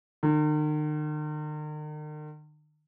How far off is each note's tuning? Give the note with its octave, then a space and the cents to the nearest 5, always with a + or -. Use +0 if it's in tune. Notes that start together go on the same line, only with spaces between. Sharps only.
D#3 -45